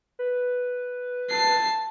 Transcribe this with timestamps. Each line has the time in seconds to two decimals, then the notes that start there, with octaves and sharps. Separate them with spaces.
0.19 B4
1.30 A5 C7